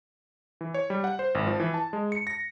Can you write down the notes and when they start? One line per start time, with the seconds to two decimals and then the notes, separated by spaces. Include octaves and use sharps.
0.61 E3
0.74 C#5
0.90 G3
1.04 F#5
1.19 C5
1.35 G#1
1.47 F3
1.60 E3
1.74 A5
1.93 G#3
2.12 C#7
2.27 A#6